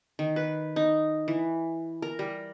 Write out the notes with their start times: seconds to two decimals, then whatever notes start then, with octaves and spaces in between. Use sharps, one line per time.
0.19 D#3
0.36 B4
0.76 D#4
1.28 E3
2.02 A#4
2.19 G3